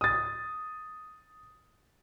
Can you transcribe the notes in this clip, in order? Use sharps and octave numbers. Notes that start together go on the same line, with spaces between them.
D#6 A6